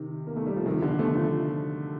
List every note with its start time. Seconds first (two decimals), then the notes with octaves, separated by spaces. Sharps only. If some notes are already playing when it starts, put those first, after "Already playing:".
Already playing: C3 D#3
0.27 A#3
0.36 A3
0.47 G3
0.56 F3
0.66 C3 D#3
0.82 D3 F3
0.99 F3 A3
1.15 F3 A3